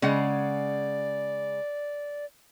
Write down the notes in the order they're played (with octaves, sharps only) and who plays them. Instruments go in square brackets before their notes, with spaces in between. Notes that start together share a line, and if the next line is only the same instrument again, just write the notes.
[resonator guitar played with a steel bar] C#3 G#3 F#5 [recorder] D5